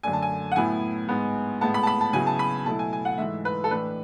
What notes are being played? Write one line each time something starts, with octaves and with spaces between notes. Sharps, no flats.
F#2 D3 A3 D4 G#5
A5
G#5
F#5
A2 F#3 B3 E4 G#5
G#2 G#3 B3
A2 G#3 B3 A5
B5
A5
B5
A5
C#3 F#3 B3 E4 G#5
A5
B5
B2 F#3 A3 E4 A5
G#5
G#5
F#5
G#2 E3 A3 E5
B4
A4
A2 E3 A3 D4 B4